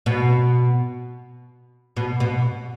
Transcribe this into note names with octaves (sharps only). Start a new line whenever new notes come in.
B2
B2
B2